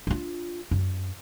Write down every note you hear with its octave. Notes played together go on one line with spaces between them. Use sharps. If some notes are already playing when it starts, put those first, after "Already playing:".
D4 F4
F#2